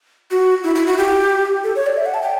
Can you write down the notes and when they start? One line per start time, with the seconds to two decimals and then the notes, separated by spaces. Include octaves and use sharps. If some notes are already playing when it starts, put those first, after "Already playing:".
0.31 F#4
0.64 E4
0.75 E4
0.87 F#4
0.98 G4
1.64 A4
1.76 C#5
1.86 D5
1.97 E5
2.06 F#5
2.14 A5
2.23 G5